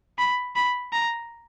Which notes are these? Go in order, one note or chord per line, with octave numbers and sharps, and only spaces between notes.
B5
B5
A#5